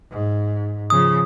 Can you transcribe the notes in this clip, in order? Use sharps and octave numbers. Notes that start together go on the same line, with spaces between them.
G#2
C#3 F3 D#6